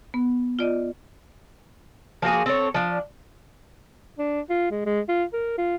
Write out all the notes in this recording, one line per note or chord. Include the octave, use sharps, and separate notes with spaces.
B3
F4 D5 D#5
F3 A#3 F#4 G#4
C4 A4 C#5
F3 D4
D4
F4
G#3
G#3
F4
A#4
F4